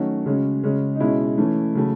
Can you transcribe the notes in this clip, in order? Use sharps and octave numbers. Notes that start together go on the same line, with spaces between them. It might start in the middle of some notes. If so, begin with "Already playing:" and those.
Already playing: D#3 F#3 A3 C#4 F#4
C#3 G#3 C#4
C#3 G#3 C#4
D#4
B2 G#3 C#4 E4
E3 A3 C#4
C#3 F#3 A3